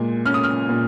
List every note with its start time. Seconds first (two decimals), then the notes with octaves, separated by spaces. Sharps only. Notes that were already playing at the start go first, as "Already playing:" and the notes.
Already playing: A#2 G#3
0.26 C#4 F6
0.34 D#6
0.43 F6
0.69 A#2